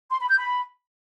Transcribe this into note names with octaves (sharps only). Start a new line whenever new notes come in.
C6
B5
G6
B5